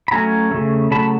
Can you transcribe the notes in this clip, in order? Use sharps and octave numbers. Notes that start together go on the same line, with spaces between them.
B5
F#3 A3 C#4 G#5 A#5
C#3 F#3 A3
C#3 F#3 A3 A5 B5